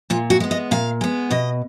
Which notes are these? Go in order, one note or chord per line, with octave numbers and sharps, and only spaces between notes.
A#2 F4
F#4
G#3 B3
D#5
A#2 F5
G#3 B3
B2 D#5